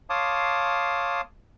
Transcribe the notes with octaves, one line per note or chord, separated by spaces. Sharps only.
C#5 F5 A5 C6 D6 D#6